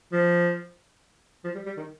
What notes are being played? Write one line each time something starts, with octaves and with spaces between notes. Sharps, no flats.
F3
F3
G3
G3
D#3